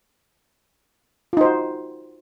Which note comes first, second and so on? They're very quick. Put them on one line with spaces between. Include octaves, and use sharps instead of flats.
F4 D#4 C5 F#4